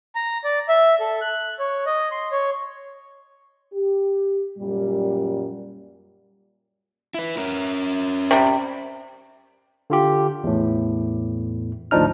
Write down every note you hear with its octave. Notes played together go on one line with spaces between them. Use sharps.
A#5
D5
E5
A4
F#6
C#5
D#5
C6
C#5
G4
F#2 A#2 G3
E4 B4
C#4 A#4
C3 G3
D3 F4 G4
E2 A2
G#1 D2 F3 D4 D#4 F6